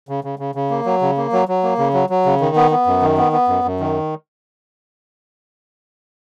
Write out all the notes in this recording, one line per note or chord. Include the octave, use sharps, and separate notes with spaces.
C#3
C#3
C#3
C#3
A#3
F#3
C#3
A#3
F#3
F#3
A#3
C#3
F#3
F#3
C#3
D#3
B3
B3
F#2
D#3
B3
B3
F#2
F#2
D#3